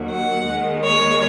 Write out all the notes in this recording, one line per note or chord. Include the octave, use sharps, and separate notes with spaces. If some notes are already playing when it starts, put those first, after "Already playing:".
Already playing: D#2 D#3 F#3
F#5
D#2 D#3 G#3
C#5